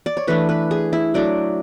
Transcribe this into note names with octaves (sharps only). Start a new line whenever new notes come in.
D5
C#5
E3 A3 D4 B4
B4
G#4
E4
F#3 A3 D4 D5